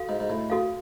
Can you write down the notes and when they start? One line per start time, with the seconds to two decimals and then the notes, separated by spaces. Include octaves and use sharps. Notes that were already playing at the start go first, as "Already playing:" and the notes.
Already playing: F#4 A4 F5
0.09 G#2
0.20 G#2
0.30 A2
0.50 F#4 A4 F5